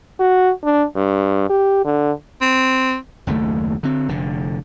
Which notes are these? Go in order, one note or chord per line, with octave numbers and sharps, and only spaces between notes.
F#4
D4
G2
G4
D3
C4
F#1 D#2 C#3 A3
D3 C4
F1 D3